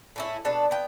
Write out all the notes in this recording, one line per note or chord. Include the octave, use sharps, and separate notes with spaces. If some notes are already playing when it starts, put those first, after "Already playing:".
A2 C#4 E4
B2 D4 A4 B4
B3 G5